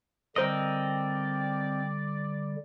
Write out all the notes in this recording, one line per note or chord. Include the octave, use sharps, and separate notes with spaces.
D3 G3 C4 A#4 C5 D5 D#5 D#6